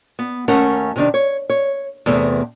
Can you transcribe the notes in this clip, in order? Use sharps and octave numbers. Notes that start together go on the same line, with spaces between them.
B3
D#2 A3 C#4 A#4 F#5
C3 D#3 D4
C#5
C#5
E2 C3 A3 B3